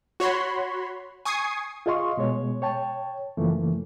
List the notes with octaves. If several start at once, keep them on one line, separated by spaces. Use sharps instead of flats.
F#4 C#5 B5 C6
G#5 C#6 D#6 G#6 C7
F4 G#4 D#5 F5 C6 C#6
B2 G#3 C#5
C#5 G5 A5
F#2 C#3 E3 F3 A3 A#3